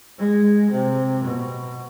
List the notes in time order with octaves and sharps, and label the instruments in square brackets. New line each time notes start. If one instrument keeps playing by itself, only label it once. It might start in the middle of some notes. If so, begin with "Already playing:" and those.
[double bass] G#3
C3
B2